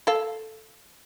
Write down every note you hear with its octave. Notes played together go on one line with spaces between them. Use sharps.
A4 F5